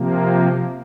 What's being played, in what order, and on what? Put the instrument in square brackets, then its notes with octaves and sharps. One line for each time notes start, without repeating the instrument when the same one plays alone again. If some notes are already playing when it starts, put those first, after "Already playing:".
Already playing: [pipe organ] C3 F3 A#3